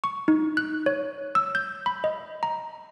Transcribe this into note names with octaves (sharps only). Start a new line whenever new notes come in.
C#6
D#4
F#6
C#5
E6
G6
B5
D#5
A#5